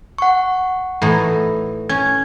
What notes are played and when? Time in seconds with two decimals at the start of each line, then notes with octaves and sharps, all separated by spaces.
0.18 F#5 C#6
1.02 A2 E3 D#4
1.89 C#4 G#6